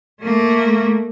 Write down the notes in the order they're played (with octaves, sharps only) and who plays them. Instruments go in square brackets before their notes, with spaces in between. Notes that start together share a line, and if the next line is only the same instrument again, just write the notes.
[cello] A3 A#3